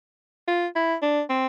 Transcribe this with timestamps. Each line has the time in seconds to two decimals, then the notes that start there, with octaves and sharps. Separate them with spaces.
0.48 F4
0.76 E4
1.03 D4
1.30 C4